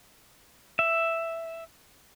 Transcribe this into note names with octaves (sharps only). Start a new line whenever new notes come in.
E5